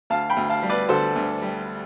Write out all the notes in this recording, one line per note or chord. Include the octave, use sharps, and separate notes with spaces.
D2 F5 A5
G5 B5
D2
F5 A5
G3
B4 D5
D3 A4 C5
D2
G3